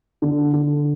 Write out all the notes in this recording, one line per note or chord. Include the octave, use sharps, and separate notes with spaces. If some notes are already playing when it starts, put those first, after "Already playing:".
D3
D3